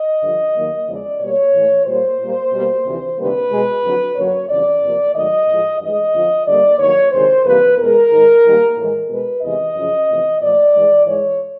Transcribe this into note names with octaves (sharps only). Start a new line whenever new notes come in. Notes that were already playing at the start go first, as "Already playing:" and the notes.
Already playing: D#5
G2 D3 F3
D#2 D#3 F#3 A#3
E2 C#3 F3 G#3 D5
B2 G3 A#3 C#5
A2 E3 A3
A#2 G3 A#3 C5
A#2 G3 A#3
B2 G3 A#3
D2 C3 E3
D2 C3 D#3 G3 A#3 B4
B2 G#3
F2 D3 F#3
F#2 D3 F#3 A#3 C#5
F2 C#3 E3 G3 D5
E2 C3 F3 A#3
G#2 D#3 F#3 A3 D#5
A2 F3 G#3
G2 E3 G#3 D#5
F2 D3 F3
G2 D3 G3 A#3 D5
G2 D#3 F#3 A#3 C#5
D2 C3 D#3 G#3 C5
F2 C3 E3 G3 A#3 B4
E2 B2 G#3 A#4
G#2 D#3 G#3
G#2 D#3 G3 A#3
A2 E3 G#3
B2 G#3 B4
E2 C3 E3 G#3 D#5
F#2 C#3 F3
F2 C3 E3 A3
A#2 F3 A3 D5
G2 E3 G#3
G#2 E3 G#3 C#5